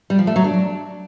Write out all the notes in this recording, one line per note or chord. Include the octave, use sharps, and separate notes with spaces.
G3
F3
A3
F#3
D4